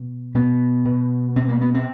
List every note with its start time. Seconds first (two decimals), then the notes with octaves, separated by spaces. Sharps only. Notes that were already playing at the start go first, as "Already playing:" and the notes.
Already playing: B2
0.34 B2 B3
0.85 B2
1.36 B2 C4
1.48 A#3
1.61 B3
1.74 C4